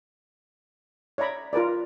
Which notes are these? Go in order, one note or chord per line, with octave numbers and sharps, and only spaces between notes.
C#5 D5 E5 A#5 B5
F4 A#4 B4 D5